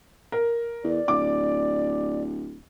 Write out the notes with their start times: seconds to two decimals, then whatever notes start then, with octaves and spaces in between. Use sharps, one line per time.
0.32 A#4
0.84 E2 D5
1.08 D1 D6